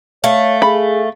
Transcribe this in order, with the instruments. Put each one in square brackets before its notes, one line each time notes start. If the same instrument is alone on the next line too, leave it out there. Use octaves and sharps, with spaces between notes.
[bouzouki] A3 [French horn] C#5 [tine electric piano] F5
[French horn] G#4 [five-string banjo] B5